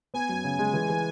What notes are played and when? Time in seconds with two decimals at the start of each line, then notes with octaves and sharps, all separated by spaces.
0.14 B3 G#5
0.29 F#2
0.44 C#3
0.59 G#3
0.74 E3
0.89 E3